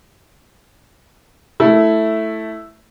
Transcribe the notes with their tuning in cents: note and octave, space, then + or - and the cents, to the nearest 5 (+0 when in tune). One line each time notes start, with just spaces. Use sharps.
A3 +0 E4 +0